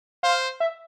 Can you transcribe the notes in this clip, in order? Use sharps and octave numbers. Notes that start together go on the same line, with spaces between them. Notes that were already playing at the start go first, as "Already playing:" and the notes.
C5 F5
E5